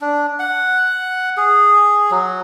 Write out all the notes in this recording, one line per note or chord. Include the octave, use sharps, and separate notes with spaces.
D4
F#5
G#4
F#3